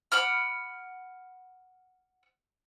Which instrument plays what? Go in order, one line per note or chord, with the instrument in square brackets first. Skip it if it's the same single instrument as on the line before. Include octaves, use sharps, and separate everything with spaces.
[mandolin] F#5 B5 D6 F6